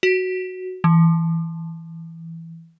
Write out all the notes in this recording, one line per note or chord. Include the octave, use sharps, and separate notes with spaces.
F#4
E3